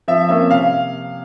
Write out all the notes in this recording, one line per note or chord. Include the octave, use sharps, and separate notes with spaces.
F3 E5
A#3 C#4 E5
C3 F5